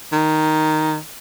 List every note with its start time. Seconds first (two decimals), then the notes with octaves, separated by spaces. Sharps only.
0.13 D#3